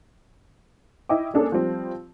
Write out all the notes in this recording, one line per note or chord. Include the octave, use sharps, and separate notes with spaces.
E4 D#5 G5 D6
A#3 C#4 D4 G#4 A4
F3 G3 C4